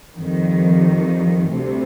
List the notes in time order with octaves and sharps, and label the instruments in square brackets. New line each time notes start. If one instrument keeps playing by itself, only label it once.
[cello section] F2 D#3 G3
D2 C3 G3